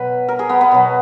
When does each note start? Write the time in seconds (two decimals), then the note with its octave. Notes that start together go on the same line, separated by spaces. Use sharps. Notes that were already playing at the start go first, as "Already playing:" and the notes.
Already playing: B2 F#3 B4
0.28 A#4
0.39 G#4
0.49 B3
0.61 B3
0.72 B2 F#3